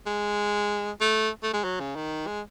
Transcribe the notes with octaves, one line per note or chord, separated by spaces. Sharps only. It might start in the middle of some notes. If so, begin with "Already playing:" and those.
G#3
A3
A3
G#3
F#3
C#3
D#3
G#3